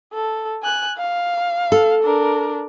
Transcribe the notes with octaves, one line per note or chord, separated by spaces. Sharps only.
A4
G#5 F#6
F5
A4
D4 A#4